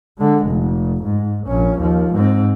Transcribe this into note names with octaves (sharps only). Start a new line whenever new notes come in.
D3 G#3
F1
G#2
A#1 C#4
D#2 F3
G#2 C4